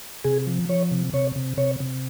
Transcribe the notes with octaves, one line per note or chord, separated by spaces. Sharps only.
C3 G#4
F3
F3 C#5
C3
C3 C#5
C3
C3 C#5
C3